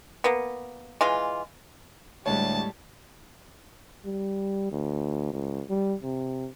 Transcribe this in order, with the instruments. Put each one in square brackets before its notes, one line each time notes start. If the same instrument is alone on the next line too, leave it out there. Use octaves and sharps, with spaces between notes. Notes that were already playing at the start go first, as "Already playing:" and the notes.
[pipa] A#3 B3
E3 G#3 F4
[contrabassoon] D2 [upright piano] A2 G#3 C#5 [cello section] G3 [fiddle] A5
[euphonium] G3
D2
C#2
G3
C3